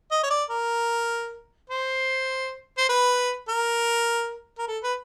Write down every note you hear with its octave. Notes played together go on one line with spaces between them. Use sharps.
D#5
C#5
D5
A#4
C5
C5
B4
A#4
A#4
A4
B4